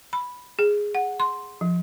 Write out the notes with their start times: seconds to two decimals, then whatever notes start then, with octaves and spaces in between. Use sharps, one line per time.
0.13 B5
0.59 G#4
0.95 F#5
1.20 C6
1.61 F3